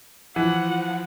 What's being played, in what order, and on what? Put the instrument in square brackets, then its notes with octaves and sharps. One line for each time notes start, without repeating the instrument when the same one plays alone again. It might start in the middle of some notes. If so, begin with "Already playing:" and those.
[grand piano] E3 [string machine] F3 [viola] F#5